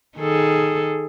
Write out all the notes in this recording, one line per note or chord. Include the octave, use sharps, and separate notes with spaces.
D#3 G#4 A4